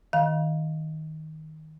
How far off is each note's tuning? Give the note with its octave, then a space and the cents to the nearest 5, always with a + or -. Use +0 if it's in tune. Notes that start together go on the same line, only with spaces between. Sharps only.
D#3 +10 F5 +0 A#5 +45